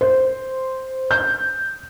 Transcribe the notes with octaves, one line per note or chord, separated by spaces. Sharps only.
C5
G6